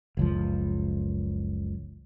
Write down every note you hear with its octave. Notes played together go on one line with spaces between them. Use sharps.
F#1 C#2 F3